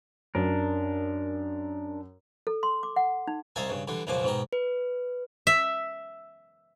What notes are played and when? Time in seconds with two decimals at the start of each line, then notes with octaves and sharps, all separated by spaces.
0.35 F#2 D4 A#4
2.47 A4
2.63 C6
2.83 D6
2.96 F#5
3.27 D#4
3.56 C2 D#4 E5 F5 G#5 A5
3.69 G2 C#3
3.88 D3 E3 G3
4.07 C#2 F#2 B2 F3 A#3 D6
4.23 G#2 B2 G4 A#4
4.53 B4
5.47 E5